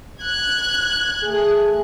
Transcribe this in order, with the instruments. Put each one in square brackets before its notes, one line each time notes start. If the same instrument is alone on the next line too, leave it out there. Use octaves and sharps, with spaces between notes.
[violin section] F#6 G#6
[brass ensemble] A3 G#4